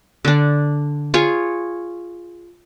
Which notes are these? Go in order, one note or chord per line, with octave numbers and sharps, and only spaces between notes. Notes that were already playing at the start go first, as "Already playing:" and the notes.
D3 D4
F4 G#4 C#5